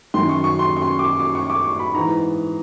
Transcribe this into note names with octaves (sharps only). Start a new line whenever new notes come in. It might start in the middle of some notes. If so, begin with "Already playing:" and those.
F#2 D#3 C6
C#6
C#6
C6
C#6
C6
D6
C#6
D6
C#6
D6
C#6
B5
G#2 E3 A#5